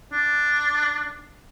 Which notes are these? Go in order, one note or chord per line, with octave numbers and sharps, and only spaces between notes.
D4